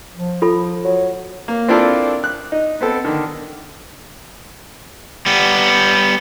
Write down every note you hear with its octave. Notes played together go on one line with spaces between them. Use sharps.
F3
F4 A4 B5
F#3
A#3
C4 D4 E4 F4 A4 A#4
F#6
D#4
B3 C4 A4
D3 D#3
G3 B3